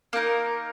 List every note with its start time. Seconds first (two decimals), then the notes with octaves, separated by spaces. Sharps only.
0.13 A#3 D#4 A#4